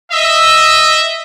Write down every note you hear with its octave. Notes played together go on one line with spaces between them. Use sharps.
D#5 E5